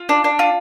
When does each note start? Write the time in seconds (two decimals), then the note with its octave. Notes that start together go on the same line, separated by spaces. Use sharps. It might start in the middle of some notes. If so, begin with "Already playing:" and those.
Already playing: F4
0.09 D4
0.24 D4
0.39 F4